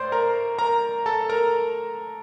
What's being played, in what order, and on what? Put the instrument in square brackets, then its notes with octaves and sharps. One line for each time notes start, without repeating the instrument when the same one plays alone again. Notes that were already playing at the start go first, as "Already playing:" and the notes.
Already playing: [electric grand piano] A2 C5 D5 C6
A#4 A#5
A#4 A#5
A4 A5
A#4 A#5